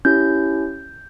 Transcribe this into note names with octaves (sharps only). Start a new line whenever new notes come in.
C#4 E4 G4 G6